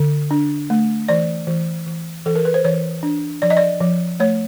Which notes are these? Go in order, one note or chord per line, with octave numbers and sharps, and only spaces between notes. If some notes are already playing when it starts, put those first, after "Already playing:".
Already playing: D3
D4
A3
E3 D5
E3
E3
E3 A4
A#4
B4
C5
E3 C#5
D4
F3 D5
D#5
D5
F3
A3 C#5